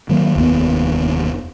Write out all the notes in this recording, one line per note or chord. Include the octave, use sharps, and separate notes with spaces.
D#3 F#3 A3 A#3
F1 D#2 A2 B3